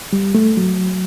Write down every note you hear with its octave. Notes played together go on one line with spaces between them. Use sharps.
G3
A3
F#3